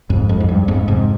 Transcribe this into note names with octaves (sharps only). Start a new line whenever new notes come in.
F2 G#2
F2
G#2
G2
F2 G#2
G#2 C3